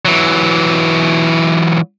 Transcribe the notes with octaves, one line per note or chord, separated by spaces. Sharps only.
E3 F#3